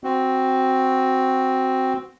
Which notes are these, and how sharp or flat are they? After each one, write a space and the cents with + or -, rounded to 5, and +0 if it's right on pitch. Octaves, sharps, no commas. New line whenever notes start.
C4 +0 F#4 +0